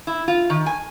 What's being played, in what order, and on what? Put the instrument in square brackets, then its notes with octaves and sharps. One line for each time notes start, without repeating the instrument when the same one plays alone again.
[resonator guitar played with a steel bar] E4
F4
D#3
G#5